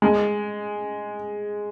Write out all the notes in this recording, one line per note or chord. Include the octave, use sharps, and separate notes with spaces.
G#3